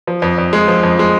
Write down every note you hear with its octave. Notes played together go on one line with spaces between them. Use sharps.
F3
F2
F2
G#3
F3
F2
G#3